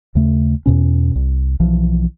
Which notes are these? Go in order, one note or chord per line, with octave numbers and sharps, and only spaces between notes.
D#2 C#3 A3
E2 B2 C#4
C2
B1 E3 F3